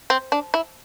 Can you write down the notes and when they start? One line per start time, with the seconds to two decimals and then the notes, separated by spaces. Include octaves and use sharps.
0.10 C4
0.32 D4
0.54 E4